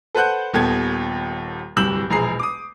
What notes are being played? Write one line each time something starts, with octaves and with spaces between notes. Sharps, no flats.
A4 B4 C5 F#5 F#6 G6
D#1 D#2 B3 A4 G#6
D1 C2 G2 E6 G6 F#7
E1 A#1 G#4 A#5 C7
D6 D#6